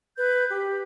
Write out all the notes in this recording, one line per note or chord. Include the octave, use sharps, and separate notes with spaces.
B4 G6
G4